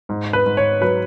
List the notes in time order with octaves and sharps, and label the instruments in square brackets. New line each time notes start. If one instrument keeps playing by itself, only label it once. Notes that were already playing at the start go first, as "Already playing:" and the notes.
[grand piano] G#2
B4
G#2
C#5
F#3 B4